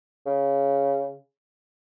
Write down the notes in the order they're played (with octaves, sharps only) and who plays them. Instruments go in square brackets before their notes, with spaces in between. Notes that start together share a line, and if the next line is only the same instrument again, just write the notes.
[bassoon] C#3